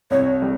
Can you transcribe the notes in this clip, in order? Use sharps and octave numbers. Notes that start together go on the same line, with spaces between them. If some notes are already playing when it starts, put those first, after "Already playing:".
C2 C#5
G3